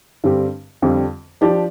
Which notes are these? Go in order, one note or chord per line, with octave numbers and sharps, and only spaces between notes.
G2 D3 G3 C4 G4
F2 D3 G3 C4 F4
F3 D4 G4 D5